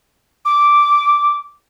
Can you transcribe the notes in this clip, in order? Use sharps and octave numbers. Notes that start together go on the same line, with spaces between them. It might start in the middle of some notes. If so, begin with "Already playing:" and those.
D6